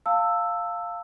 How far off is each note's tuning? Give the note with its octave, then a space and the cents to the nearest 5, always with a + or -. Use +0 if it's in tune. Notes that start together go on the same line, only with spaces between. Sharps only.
F5 +0 A5 +30 E6 +0